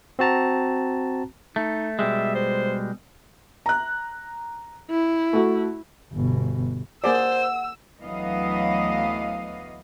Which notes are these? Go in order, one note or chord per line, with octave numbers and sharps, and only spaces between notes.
C4 F#4 A5 A#5
A3 D#4
B2 G3 G#3 E5
C5
A#5 F#6
E4
A3 F#4
G1 B2
A#3 G#4 C5 D5 F#5 E6
D2 E3 F#3 B3 D#5 F5